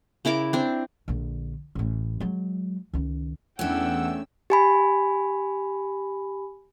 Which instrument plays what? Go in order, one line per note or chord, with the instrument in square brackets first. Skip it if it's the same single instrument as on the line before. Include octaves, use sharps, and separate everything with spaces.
[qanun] C#3 E4 A#4 D6
C4 D4
[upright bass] A#1 D3
A1 A2
F#3 G#3
C#2 D#3
[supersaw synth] E2 E6 [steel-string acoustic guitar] A3 C#4 [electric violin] D4 G5 [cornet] F#5
[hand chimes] G4 G#5 B5